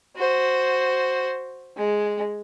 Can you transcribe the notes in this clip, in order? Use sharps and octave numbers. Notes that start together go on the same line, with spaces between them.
F#4 C5
G#3